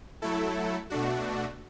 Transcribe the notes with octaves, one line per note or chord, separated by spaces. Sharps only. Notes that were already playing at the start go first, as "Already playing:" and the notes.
F#3 A3 E4 A4
B2 A3 D4 F#4